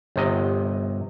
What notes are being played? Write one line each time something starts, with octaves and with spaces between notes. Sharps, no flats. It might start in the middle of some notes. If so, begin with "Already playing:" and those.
G1 C3 D#5